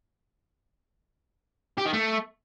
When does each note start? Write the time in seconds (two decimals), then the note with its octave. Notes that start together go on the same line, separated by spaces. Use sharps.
1.78 G4
1.86 D#3
1.93 A3